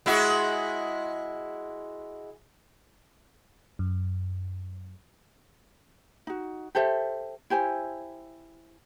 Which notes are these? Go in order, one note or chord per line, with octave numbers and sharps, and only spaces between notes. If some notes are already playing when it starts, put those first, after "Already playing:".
G#3 E4 F#4
F#2
D#4 F#4
G4 A4 C5 E5
E4 G4 C5 G#5